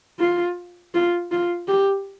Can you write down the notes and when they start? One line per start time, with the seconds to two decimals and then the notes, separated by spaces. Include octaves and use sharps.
0.19 F4
0.95 F4
1.31 F4
1.68 G4